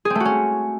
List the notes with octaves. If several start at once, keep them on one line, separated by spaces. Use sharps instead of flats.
G#4
C4
A3
F#4
C#4